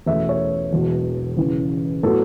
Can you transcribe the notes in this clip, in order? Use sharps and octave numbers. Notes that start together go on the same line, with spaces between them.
E2 B2 A3 C#4 E5
C#5
E1 E2 B2 F#3
E1 E2 C#3 E3
A2 F#3 B3 A4